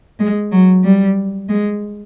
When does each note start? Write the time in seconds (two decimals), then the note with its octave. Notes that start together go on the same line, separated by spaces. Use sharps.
0.19 G#3
0.52 F#3
0.84 G3
1.49 G#3